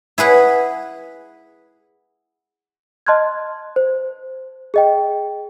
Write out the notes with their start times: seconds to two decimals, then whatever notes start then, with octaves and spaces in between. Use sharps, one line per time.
0.18 E4 G#4 B4 F#5
3.07 D#5 A5 C6 F6 F#6 G#6
3.76 C5
4.74 G#4 D#5 G5